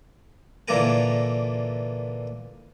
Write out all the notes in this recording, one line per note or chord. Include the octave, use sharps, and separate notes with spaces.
A#2 D3 E3 A#3 A#4 G#5